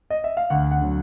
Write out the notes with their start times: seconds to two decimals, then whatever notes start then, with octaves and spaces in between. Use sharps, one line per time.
0.10 D#5
0.24 E5
0.37 F5
0.50 D2 F#5
0.71 F#5
0.81 D3 F#3